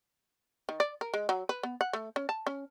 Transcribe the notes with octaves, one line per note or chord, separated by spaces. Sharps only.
D#3
D5
A#4
G#3
F#3
B4
B3
F#5
A3
C#4
A5
C#4